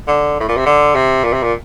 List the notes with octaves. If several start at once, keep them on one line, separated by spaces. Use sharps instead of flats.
D3
A2
A#2
C3
D3
C3
A#2
C3
A#2